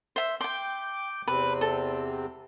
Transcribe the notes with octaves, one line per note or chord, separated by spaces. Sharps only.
C5 E5
G5 C6 D6 G6
E2 C3 C4 B4
A4